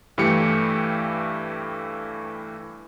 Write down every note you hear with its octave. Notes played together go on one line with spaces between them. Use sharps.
G2 E3 A3 G4 C#7